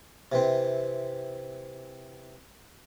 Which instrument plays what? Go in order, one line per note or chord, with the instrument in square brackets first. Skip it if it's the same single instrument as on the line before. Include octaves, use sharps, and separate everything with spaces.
[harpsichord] C3 E3 C4